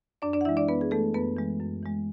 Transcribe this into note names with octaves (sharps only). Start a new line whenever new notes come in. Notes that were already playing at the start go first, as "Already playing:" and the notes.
F#2 D4 D5
D4 D5
F#5
E3 G#3 E4 E5
D4 D5
F#2 B3 B4
G#4
E3 G#3 A3 A4
F#2 B3 B4
E3 G#3
F#2
E3 G#3